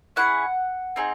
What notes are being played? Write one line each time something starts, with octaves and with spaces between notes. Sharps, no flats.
C#4 E4 G#4 F#5
C4 D#4 G#4